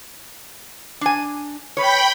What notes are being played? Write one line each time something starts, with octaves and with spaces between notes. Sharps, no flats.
D4 G#5
B4 C#5 G5 B5